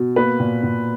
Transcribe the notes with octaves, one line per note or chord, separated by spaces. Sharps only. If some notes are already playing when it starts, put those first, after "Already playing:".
Already playing: B2
A#3 B4
A#2
A#2